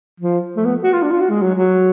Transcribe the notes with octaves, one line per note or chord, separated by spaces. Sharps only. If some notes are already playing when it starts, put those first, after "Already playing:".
F3
A3
B3
F#4
F4
D4
F4
F#4
G#3
F#3
F#3